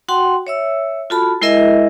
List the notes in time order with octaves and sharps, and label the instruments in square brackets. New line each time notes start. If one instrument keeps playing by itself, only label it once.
[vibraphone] F#4 F#5 G5 C6
C#5 E5 E6
F4 F#4 A4 A5 B5
G#3 E4 G#4 A#4 D#5 E5